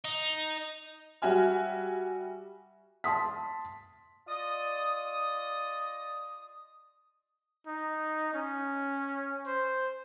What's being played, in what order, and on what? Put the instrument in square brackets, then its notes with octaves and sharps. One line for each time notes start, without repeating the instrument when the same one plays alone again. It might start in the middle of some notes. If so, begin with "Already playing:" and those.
[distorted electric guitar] D#4
[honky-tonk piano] G3 F#4 E5 G#5 F6
[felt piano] A5 C6 D#6 B6
[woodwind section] F4 D5 D#5 D#6
[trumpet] D#4
C#4
C5